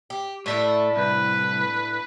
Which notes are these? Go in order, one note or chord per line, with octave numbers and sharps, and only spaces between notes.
G4
A2 A3 D4 E4 E5
C2 B4